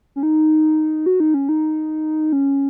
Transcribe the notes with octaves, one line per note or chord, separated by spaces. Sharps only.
C#4
D#4
F#4
D#4
C#4
D#4
C#4